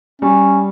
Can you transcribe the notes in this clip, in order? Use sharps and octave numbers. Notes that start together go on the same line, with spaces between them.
G3 C#4